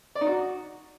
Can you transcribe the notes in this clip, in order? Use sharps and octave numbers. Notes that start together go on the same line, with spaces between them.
D5
D#4
F#4